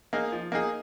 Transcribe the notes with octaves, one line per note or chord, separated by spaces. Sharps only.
A#3 D#4 G#4
F3
A#3 D#4 G#4